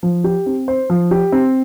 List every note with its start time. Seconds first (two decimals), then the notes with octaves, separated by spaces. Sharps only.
0.03 F3
0.24 G4
0.46 C4
0.68 C5
0.90 F3
1.11 G4
1.32 C4